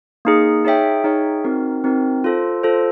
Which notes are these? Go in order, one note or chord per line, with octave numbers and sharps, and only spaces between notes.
A#3 D#4 G#4
D#4 G#4 C#5 E5 G5
D#4 G#4 C#5 E5 G5
C4 D#4 F#4 A#4
C4 D#4 F#4 A#4
F4 A4 C5
F4 A4 C5